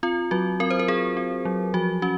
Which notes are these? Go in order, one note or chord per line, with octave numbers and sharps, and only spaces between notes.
C4 F4
F#3 F#4
C4 A#4
C5
A#4
C4 G#4
C4
F#3
F3 F#4
C#4 F#4